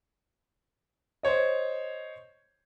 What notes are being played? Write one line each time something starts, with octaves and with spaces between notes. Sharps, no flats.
C5 C#5 D#5